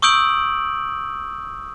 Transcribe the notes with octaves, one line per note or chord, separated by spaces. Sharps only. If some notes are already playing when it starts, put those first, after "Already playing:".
C#6 D#6 E6 G6 D7 F#7